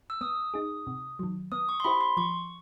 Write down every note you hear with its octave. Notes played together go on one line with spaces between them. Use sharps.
E6
B3 D#6
D#4 G#4
C3
D#3 F#3
B3 D#6
C#6
C6
E4 G4 C5 B5
C6
F3 C#6